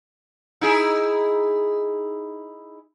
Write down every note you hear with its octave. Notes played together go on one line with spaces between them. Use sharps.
D#4 E4 G#4